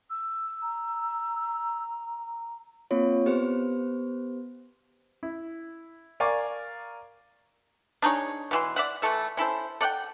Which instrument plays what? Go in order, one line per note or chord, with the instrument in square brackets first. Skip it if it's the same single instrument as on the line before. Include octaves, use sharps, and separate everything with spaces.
[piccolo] E6
[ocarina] A#5
[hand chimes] A#3 C4 F4 C#5
B3 G4 B4 C5
[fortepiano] E4
A#4 D5 F5 G#5 C#6 D6
[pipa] D4 D#4 G#4 C#5
B2 E3 C6
D5 E5 F#5
E3 A3 A4 E5
C#4 E4 A4 C5
A4 D5 F#5 G5